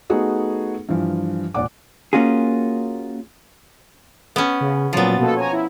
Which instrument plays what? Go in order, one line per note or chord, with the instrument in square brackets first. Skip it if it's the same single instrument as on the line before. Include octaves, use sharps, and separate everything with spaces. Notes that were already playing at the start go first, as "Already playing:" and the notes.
[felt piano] A3 B3 D#4 F#4 G#4 A4
G2 E3 F3
E1 A#2 D5 F#5 D6
[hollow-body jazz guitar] A#3 C#4 F4 F#4 G#4
[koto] B3 C#4
[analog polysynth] C#3
[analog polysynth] A#2 F#3 A6 [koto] F3 B3
[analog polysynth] B2 A#3 A4
C#5 G#5 A#5
E4